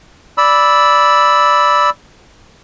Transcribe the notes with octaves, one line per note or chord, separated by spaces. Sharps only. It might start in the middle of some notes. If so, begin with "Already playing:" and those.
D5 B5 E6